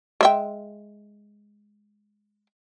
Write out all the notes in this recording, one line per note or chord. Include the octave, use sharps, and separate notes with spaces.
G#3 E5 G5